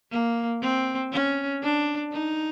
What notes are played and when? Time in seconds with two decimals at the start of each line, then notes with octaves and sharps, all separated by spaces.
0.11 A#3
0.62 C4
1.12 C#4
1.62 D4
2.12 D#4